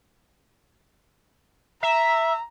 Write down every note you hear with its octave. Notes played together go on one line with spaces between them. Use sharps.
E5 A#5